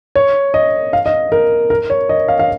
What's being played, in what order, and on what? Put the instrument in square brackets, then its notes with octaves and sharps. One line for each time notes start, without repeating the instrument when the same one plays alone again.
[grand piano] C#5
D#5
F5
D#5
A#4
A#4
C#5
D#5
F5
F5